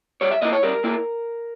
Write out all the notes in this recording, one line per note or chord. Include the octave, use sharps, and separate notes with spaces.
G3 C#5
E5
A#3 E4 D#5
C#5
G3 A#4
A#3 E4